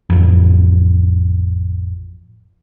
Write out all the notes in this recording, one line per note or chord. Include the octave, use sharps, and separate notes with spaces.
A1 F2